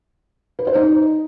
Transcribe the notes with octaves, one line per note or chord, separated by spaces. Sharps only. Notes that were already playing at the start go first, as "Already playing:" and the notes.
B4
C5
D#4